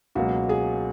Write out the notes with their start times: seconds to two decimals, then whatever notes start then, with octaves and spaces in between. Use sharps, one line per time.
0.15 C#2 B2 F#3 A#3 F#4
0.49 G#4